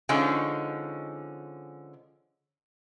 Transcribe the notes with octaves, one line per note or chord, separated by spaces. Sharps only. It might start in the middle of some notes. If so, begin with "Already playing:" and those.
D3 F3 G#3 C#4 D#4